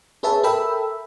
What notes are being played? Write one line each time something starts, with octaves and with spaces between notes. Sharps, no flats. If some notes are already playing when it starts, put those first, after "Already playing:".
G#4 B4 C#5 E5 A5
A4 A#4 E5 G5 B5 E6